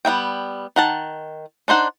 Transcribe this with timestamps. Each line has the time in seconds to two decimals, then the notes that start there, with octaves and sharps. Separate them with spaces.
0.05 G3 B3 E5 G5
0.76 D#3 F#5 A5
1.68 D4 D#4 C5 F#5